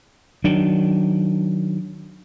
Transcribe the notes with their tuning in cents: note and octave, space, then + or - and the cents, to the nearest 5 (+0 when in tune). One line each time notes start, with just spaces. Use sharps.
D#3 -5 F#3 +5 D4 +0